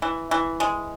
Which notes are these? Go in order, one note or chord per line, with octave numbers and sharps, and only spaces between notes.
E3
E3
G#3